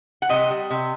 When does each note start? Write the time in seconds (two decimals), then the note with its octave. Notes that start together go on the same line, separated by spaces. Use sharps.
0.22 F#5
0.29 C3 D#5
0.50 G3
0.71 C3